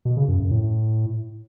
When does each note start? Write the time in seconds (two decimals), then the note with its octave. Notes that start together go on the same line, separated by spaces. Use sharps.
0.05 B2
0.17 C#3
0.28 F#2
0.40 F#2
0.51 A2